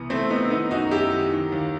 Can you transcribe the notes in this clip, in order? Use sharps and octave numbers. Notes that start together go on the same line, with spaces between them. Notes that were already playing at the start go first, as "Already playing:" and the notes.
Already playing: C2 E3 B3
C2 A3 C4
C3 B3 D#4
E4
D#3 B3 D#4
F#2 D#4 F#4
F#2 E4 G4
D#3
D#3
D#2